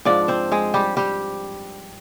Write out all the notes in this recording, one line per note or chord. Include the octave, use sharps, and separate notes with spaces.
G#2 F3 D4 D5
C4 C5
G#3 G#4
G3 G4
G3 G4